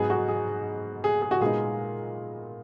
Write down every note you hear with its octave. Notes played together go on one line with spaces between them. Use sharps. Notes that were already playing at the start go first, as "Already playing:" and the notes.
Already playing: G#2 F#3 B3 G#4
F#4
G#4
G#4
G#4
F#4
A#2 G#3 B3 D#4 G#4